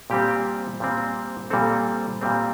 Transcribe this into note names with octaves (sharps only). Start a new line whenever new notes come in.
A#2 G3 C4 G4
A#2 G3 C4
A#2 G3 C4 A4
A#2 G3 C4